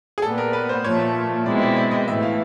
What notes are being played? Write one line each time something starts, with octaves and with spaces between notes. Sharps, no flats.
G#4
A#2 G3 B3 A4
A#4
B4
C5
A#2 F3 A3 C#5
B2 G#3 C4 E4 D5
D5
D5
D#5
A2 E3 A3 E5
F5